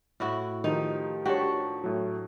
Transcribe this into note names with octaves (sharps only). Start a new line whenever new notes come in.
A2 E4 F#4
D#3 F3 D#4 G4
D4 F#4 G4 C#5 A5 C#6
A2 F#3